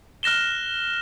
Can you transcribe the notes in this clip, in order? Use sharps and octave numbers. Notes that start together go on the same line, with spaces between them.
F6 F#6 A#6 E7 G7